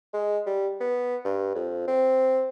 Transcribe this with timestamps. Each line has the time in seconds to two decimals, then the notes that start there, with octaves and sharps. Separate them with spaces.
0.14 G#3
0.46 G3
0.81 B3
1.25 G2
1.55 F2
1.88 C4